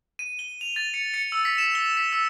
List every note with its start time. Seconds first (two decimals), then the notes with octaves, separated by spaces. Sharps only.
0.19 D#7
0.39 G7
0.61 F7
0.76 A6
0.94 C#7
1.14 C#7
1.32 E6
1.45 B6
1.58 E7
1.75 G7
1.97 B6
2.13 E6